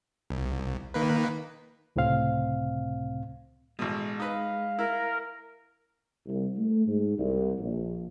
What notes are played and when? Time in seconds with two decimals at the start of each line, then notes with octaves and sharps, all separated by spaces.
0.30 C2
0.94 D#3 A#3 B4
1.96 C#2 A2 C3 C4 F5
3.79 A1 B2 G#3
4.20 D#4 B4 F5
4.79 E4 A#4
6.26 C2
6.56 A3
6.86 G#2
7.18 C2
7.59 A#1